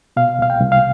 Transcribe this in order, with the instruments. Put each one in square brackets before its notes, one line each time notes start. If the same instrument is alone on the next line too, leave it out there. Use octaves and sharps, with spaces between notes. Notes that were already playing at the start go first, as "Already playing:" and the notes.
[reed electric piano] B2 F5
C2 F5
G5
C2
F5